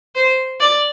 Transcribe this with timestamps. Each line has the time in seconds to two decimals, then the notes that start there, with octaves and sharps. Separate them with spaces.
0.15 C5
0.60 D5